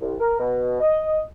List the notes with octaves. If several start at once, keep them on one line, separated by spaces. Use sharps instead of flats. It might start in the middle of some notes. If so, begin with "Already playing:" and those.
C2
A#4
B2
D#5